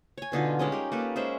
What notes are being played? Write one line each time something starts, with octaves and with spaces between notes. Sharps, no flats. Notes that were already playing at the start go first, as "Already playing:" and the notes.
C#5 G#5
B2 D3 D#4 F4
G3 G#3 C#4 D#5
G4 A#4
A#3 G4 A4 B4
G#3 C#4 C5 E5